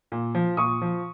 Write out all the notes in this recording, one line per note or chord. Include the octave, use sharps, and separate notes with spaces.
A#2
F3
A#2 C#6 D#6
F3